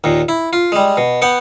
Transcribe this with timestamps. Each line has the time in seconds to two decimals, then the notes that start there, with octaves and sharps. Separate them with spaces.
0.04 D#2 A#2
0.29 E4
0.53 F4
0.72 G3 G#3
0.97 B2
1.22 B3 F#5 G5